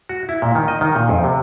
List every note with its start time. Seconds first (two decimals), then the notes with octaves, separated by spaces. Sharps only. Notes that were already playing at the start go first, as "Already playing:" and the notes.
0.09 F#4
0.29 E4
0.42 A#2
0.55 D#3
0.68 D#5
0.81 D#3
0.96 A#2
1.09 F2
1.24 C3